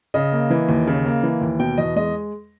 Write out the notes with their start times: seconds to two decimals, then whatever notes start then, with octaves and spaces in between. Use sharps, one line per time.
0.14 C#3 D#5
0.32 A#3
0.50 E3
0.69 D#2
0.87 C#3
1.05 A#3
1.23 E3
1.41 D#2
1.59 B2 G5
1.78 E2 D#5
1.96 G#3 D#5